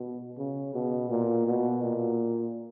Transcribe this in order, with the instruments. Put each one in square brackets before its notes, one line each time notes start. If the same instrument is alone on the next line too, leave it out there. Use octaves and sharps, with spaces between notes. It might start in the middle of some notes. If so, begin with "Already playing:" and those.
Already playing: [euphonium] B2
C#3
B2
A#2
B2
A#2